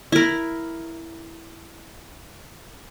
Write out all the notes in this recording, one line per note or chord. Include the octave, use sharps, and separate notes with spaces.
E4 A#4